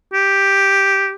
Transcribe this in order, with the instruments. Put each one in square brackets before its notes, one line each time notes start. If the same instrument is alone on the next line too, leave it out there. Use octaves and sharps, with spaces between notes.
[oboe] G4